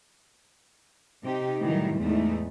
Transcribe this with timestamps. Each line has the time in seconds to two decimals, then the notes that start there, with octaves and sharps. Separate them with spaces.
1.24 C3 D#4 G4
1.63 A2 D#3 E3 F#3 G3
1.99 E2 A2 G#3 A3 D#4